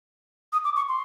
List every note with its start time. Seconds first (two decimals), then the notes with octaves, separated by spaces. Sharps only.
0.53 D#6
0.64 D6
0.76 C#6
0.88 C6